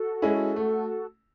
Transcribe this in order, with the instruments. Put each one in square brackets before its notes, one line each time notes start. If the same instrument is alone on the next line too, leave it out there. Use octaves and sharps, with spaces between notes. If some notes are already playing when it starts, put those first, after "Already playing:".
Already playing: [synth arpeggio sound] F#4 A4
[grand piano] G#3 C#4 E4
A3